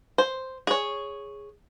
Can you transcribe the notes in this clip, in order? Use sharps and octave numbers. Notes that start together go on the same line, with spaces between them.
C5
G#4 C#5